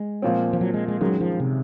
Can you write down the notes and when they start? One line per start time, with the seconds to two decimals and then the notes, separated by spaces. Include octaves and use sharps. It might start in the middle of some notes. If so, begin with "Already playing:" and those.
Already playing: G#3
0.22 A#2 F3 C4
0.53 F3
0.61 F#3
0.74 G#3
0.88 G#3
1.01 F#2 D#3 F#3 G#3
1.20 F3
1.40 C3